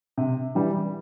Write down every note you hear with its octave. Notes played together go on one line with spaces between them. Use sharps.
C3
E3 G3